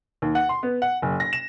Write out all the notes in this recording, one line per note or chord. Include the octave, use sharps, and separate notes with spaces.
D#2
F#5
C6
B3
F#5
F#1
A#6
E7